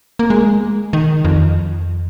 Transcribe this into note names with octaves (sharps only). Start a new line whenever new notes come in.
A#3
G#3
D#3
F2